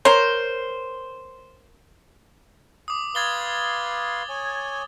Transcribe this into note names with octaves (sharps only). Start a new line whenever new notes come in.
A#4 C5 C#5
D6 D#6
B4 F5 C6 G#6 A6 G7
C#5 G#5